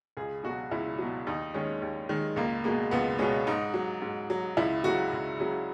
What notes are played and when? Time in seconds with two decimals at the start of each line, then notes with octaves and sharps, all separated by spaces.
0.17 C#2 G#4
0.44 B2 F#3 F#4
0.71 C#2 E4
0.99 B2 F#3
1.27 D#2 D#4
1.54 D#3 G#3 C#4
1.82 D#2
2.09 D#3 G#3
2.36 C#2 A#3
2.64 B2 G#3 A#3
2.91 C#2 B3
3.19 B2 G#3 C#4
3.47 G#2 D#4
3.74 F#3
4.02 G#2
4.30 F#3
4.57 C#2 E4
4.84 C#3 F#3 F#4
5.13 C#2
5.40 C#3 F#3